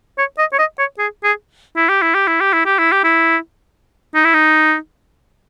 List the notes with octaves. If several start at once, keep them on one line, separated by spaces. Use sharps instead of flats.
C#5
D#5
C#5
D#5
C#5
G#4
G#4
E4
G4
E4
G4
E4
G4
E4
G4
E4
G4
E4
D#4
E4
D#4